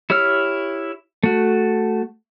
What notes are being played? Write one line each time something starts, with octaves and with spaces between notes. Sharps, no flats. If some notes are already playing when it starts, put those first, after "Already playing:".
E4 G4 C#5 E6 F6
A3 F#4